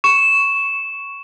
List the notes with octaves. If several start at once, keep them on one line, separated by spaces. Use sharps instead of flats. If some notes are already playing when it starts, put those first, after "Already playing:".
C#6 E7